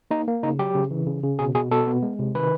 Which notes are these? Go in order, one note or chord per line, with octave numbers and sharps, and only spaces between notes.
A#3 D#4
A#3
C#3 D#4
F#3 G4
C#3
E3
C#3
C#3
B2 G#4
B2 G#4
B2 A4
B3
G#3
C3
D#3 B4